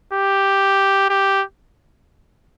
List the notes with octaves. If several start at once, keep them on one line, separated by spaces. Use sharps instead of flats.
G4
G4